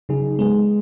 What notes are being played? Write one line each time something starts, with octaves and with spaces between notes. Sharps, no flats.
C#3 F#3 D#4 G#4
G#3 B3 G#4